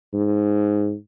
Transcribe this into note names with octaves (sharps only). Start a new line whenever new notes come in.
G#2